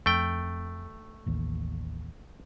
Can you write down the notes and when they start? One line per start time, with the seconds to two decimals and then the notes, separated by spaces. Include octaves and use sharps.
0.06 F2 A3 G5
1.27 A1 D#2